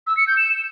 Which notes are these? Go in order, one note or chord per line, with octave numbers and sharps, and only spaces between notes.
E6
C#7
G6
E7